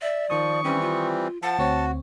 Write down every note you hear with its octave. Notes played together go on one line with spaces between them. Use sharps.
D5 E5
D#3 F3 C#6 D#6
E3 G3 C4 C#4
F4
F3 F#5 A5
D2 C4 F#4 C#5